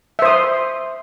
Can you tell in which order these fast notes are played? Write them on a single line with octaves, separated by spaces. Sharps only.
E5 C5 D#6 C6